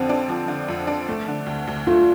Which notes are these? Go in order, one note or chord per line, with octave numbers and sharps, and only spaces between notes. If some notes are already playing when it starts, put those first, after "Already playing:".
Already playing: F2 D3 F3 C4
D4
F3
D3
F2
D4
A3
D3
D2
D2
A3 F4